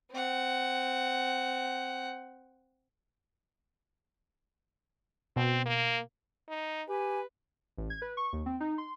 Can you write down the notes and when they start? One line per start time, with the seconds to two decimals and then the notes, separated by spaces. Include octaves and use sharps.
0.11 C4 F#5
5.36 B2 C4
5.66 A#3
6.48 D#4
6.89 G4 B4 G#5
7.78 A1
7.90 G#6
8.02 B4
8.17 C#6
8.33 D#2
8.46 C4
8.60 D#4
8.78 C6